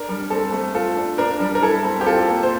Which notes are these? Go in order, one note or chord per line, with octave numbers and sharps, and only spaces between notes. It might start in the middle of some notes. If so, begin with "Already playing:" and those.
Already playing: D4 A#4
G3
C4 A4
A3
F4 A4
D4
D4 A#4
G3
A#4
E4 A4
C4
G4
F4 A4
A#3
C5